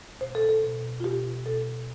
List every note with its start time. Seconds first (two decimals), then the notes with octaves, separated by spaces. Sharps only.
0.21 B2 C5
0.35 A4
0.49 A4
0.63 B2
1.00 F4
1.04 B2 G4
1.46 B2 A4